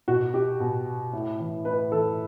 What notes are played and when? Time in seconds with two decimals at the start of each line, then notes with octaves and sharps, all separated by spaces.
0.08 B2 F#4
0.34 G4
0.60 B2
1.13 A2
1.40 E3
1.65 A2 B4
1.92 E3 A4